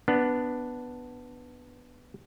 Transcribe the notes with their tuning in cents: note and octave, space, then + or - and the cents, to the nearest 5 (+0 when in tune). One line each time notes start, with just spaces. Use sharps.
B3 +0 D4 +0